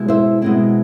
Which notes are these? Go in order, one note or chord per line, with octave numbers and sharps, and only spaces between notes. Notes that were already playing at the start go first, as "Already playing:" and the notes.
Already playing: B2 G#3 E4
C5 E5
B2 G#3 C4 E4